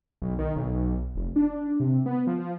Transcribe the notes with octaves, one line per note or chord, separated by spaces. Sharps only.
B1
D#3
B1
F1
D4
C3
B3
F3